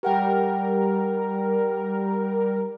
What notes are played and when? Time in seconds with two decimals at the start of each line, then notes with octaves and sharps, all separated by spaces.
0.03 G3 G4 A#4 F#5 G5